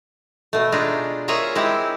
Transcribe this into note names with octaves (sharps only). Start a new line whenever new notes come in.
B2 A3
G#3 D4 D#4 F4
A#3 F4 G#4 C#5 E5 A#5
G#3 C4 E4 G4